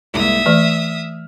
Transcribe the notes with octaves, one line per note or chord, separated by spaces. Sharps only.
C2 G#2 A#3 E5 D#6
E3 A3 D5 F6